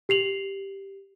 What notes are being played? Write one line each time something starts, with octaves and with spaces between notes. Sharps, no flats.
G4 C7 F7 F#7